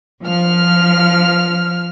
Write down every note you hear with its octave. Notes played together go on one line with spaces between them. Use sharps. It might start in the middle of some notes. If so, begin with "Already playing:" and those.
F3 F6